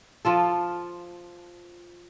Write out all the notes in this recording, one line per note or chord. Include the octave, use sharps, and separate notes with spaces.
F3 F4 A4